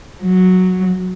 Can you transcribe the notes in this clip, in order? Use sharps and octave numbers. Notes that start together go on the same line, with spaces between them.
F#3